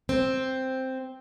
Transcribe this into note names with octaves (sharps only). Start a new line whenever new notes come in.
C4